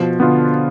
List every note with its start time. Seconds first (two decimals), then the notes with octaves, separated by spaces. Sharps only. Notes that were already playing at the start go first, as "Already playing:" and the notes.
Already playing: B2 F3
0.20 D3 B3 F4